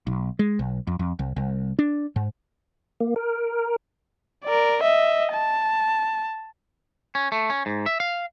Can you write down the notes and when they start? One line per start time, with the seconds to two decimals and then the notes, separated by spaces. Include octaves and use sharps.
0.07 B1
0.39 G#3
0.59 B1
0.87 F2
0.99 F2
1.19 C2
1.36 C2
1.79 D4
2.16 G#2
3.00 A#3
3.16 A#4
4.44 A#4 D5
4.82 D#5 E5
5.33 A5
7.15 C#4
7.32 A3
7.50 C#4
7.66 G#2
7.86 E5
8.00 F5